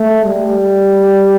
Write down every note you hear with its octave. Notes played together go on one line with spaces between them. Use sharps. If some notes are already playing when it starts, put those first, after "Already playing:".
Already playing: A3
G3